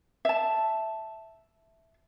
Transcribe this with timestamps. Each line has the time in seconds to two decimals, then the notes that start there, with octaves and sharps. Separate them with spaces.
0.25 E5 A5